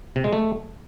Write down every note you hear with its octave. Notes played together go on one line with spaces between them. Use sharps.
C3
G#3
A3